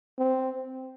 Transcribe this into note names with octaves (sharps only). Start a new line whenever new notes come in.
C4